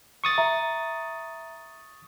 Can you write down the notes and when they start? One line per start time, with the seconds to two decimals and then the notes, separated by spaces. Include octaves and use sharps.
0.24 C#6 D#6 A6
0.38 E5 A#5